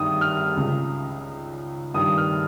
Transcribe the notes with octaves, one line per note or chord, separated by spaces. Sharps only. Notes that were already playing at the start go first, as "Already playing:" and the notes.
Already playing: G2 D#3 D#6
F6
C#2 C#3
G2 D#3 D#6
F6